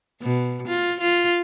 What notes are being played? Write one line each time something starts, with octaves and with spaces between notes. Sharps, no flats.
B2
F4
F4